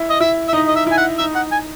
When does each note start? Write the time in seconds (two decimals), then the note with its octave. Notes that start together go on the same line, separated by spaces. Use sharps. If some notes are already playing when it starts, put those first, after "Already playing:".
Already playing: E4
0.10 D#5
0.21 E4 E5
0.49 E5
0.53 D#4 D#5
0.68 D#5
0.76 E5
0.87 E4
0.92 G#5
0.98 F#5
1.19 D#4 E5
1.36 F#5
1.52 G#5